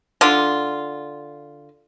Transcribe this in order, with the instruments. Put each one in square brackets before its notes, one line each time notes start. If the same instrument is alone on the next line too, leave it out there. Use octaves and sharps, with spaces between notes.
[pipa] D3 F4